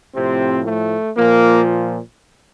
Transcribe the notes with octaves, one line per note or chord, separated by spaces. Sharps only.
A2 C3 F3 C4
A3
A#2 F3 A#3